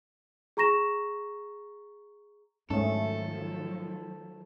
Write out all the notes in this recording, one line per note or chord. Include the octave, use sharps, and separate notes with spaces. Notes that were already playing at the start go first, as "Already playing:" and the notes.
G#4 A#5 C#6 A#6 E7
G#2 D#3 F3 F#3 A3 C#4 A4